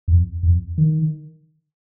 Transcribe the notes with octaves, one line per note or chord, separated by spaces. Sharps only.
F2
F2
D#3